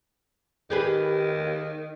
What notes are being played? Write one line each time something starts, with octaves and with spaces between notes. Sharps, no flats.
D#3 G4 G#4 B4